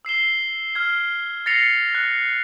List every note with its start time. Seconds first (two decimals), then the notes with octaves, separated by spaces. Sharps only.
0.05 E6 C7 E7 G7
0.75 F6 G#6
1.46 A6 A#6 C7 C#7 F7
1.95 F#6